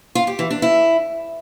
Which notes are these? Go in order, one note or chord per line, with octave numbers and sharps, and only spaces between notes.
F4
G4
E3
D4
E4